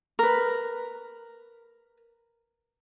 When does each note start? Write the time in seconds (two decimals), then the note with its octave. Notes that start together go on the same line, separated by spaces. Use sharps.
0.19 A#4 B4